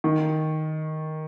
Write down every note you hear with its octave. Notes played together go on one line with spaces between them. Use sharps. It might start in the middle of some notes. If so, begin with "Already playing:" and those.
D#3